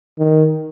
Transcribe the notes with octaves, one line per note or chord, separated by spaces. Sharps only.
D#3